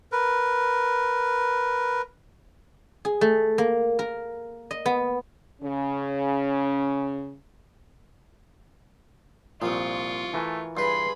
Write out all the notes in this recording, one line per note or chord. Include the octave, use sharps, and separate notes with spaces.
A#4 B4
G#4
A3
A#3
A#4
D#5
B3
C#3 C#4
C2 A#2 F3 F4 C#6
E3 A3 A#4 G#5
G2 G#4 B4 B5 C6